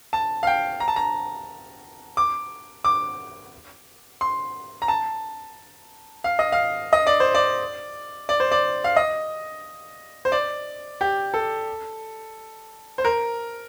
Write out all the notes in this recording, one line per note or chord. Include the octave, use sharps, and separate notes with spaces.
A5
F5
G5
A#5
A5
A#5
D6
D6
C6
A#5
A5
F5
D#5
F5
D#5
D5
C5
D5
D5
C5
D5
F5
D#5
C5
D5
G4
A4
C5
A#4